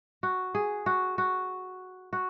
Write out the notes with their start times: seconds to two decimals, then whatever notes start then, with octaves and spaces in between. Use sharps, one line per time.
0.23 F#4
0.55 G#4
0.86 F#4
1.18 F#4
2.13 F#4